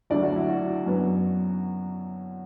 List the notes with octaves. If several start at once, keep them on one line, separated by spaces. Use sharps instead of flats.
D2 D3 F#3 A3 D5
F#4
E4
F#4
F#2 F#3 B3